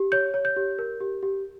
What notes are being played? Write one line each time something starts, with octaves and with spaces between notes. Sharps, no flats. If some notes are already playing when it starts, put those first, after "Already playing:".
Already playing: G4
C#5 G6
C#5
G6
G4
A#4
G4
G4